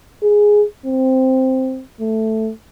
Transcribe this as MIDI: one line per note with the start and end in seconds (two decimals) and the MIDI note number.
0.23 0.64 68
0.86 1.83 60
2.00 2.51 57